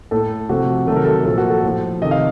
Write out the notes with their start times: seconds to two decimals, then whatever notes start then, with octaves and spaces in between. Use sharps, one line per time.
0.11 A2 A3 A4
0.49 C3 F3 A3 F#4
0.87 C3 D#3 F#3 A3 A4
0.96 A#4
1.05 A4
1.25 A#2 F3 A#3 A4
1.38 F#4
1.50 A4
1.63 A2 F3 A3
2.02 C3 D#3 A3 D#5
2.11 F5